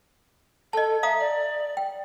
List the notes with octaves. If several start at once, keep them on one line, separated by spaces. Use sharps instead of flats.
A4 D#5 A5
E5 F5 A#5 D#6
D5
G5